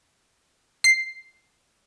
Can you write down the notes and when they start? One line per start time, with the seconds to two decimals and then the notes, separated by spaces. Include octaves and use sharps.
0.84 C7